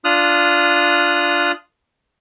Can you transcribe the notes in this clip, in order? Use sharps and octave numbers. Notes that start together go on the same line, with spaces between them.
D4 F4 D#6 F6 F#6